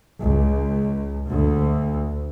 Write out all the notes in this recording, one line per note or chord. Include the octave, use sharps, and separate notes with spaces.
C#2
D2